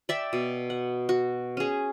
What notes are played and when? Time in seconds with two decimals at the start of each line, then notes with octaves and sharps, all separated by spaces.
0.09 D5 E5 G5
0.33 B2
0.70 F#5
1.09 F#4
1.57 C#4 G#4